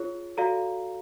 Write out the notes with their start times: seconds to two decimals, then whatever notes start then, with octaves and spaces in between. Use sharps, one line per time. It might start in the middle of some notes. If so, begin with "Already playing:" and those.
Already playing: F4 G#4 C#5
0.37 F#4 A4 D5 F5 A#5